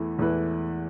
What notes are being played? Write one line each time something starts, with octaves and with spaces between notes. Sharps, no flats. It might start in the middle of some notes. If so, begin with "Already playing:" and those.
Already playing: E2 E3 A3 E4
E2 E3 A3 E4 B4